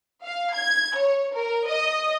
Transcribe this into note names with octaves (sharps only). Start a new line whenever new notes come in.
F5
G#6
C#5
A#4
D#5